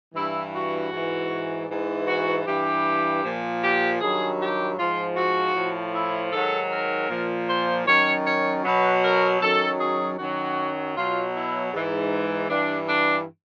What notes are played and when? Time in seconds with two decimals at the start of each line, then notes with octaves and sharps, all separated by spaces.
0.14 G2 E3 E4
0.54 F#4
0.91 G#2 E3
1.69 G#2 E3
2.07 F#4
2.46 G2 E3 G4
3.24 A#2 F3
3.62 G4
4.01 G2 D#3 F#3 G#4
4.40 G4
4.78 G#2 F3 F4
5.16 F#4
5.54 A2 F3
5.94 E4
6.32 G#2 D#3 F#3 A4
6.71 A#4
7.09 A#2 F3
7.49 C5
7.86 F#2 D#3 F#3 C#5
8.25 C#5
8.64 B2 F#3 B4
9.03 A#4
9.41 F#2 D#3 F#3 A4
9.80 G#4
10.18 F#2 D#3 F#3 F#4
10.96 B2 F#3 F4
11.34 E4
11.73 G#2 E3
12.50 G2 E3 D4
12.88 D4